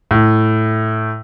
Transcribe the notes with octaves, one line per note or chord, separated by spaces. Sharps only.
A2